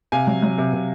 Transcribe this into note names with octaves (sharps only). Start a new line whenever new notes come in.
C3 F5 G#5
F#3
F#3
C3
C3